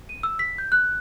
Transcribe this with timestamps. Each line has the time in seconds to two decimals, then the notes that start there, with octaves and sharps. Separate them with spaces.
0.09 D#7
0.23 E6
0.39 B6
0.58 G6
0.72 F#6